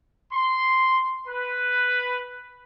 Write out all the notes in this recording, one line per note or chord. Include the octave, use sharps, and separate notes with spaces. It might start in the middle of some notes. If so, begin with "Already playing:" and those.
C6
B4